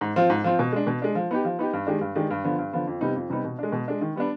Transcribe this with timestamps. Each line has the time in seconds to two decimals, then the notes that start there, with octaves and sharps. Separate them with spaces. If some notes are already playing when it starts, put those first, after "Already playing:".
0.01 G#2
0.16 F3 C4 F4
0.30 G#2
0.44 F3 C4 F4
0.59 B2
0.73 G#3 D4
0.87 B2
1.02 G#3 D4
1.15 F3
1.31 B3 D#4 G4
1.45 F3
1.59 B3 D#4 G4
1.73 G2
1.87 D#3 G#3 D4 G4
2.01 G2
2.16 D#3 G#3 D4 G4
2.30 G2
2.44 D3 F3 B3
2.58 G2
2.73 D3 F3 B3
2.87 F2
3.01 C3 G3 B3 D#4
3.15 F2
3.30 C3 G3 B3 D#4
3.45 B2
3.59 G#3 D4
3.72 B2
3.88 G#3 D4
4.01 D#3
4.16 G3 B3 D4